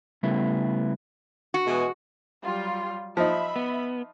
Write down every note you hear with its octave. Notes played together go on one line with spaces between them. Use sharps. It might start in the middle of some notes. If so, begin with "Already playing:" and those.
C#3 G3 A3 B3 E4
F#4
B2 E3 G#3
F#3 G3 F4
F3 D#4 E5 B5
B3